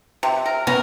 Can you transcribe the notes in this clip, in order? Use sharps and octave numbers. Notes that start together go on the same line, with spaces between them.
C3
A#4
B3 C#4 A#4